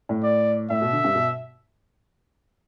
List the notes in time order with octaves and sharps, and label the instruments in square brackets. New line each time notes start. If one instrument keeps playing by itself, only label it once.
[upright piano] A2
[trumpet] D5
[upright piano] A2 [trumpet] E5
[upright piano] B2
D3
G2
B2